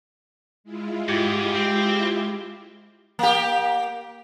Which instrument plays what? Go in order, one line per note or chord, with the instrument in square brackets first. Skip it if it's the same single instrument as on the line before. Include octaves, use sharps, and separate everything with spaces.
[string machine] G#3 E4 F4
[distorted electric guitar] G#2 [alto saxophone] G4
[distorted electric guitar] C4
[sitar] A#3 G4